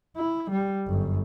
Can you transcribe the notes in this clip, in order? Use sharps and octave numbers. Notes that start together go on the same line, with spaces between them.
E4
G3
G1 F#2